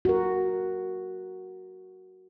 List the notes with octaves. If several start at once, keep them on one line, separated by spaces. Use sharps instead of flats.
F#4 A#4